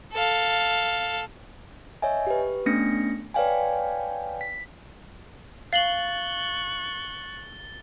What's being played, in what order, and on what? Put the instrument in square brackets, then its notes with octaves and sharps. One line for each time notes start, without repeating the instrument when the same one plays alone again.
[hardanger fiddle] A4 F5
[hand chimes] C#5 D#5 E5 G#5
G4 B4
A3 B3 C#4 D4 A#6 C#7
B4 C#5 D5 F5 G5 G#5
B6
[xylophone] F5 F#7 [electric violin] C#6 F#6 [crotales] A6 G7